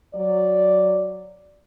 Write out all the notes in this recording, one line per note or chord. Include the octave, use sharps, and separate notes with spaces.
F#3 D5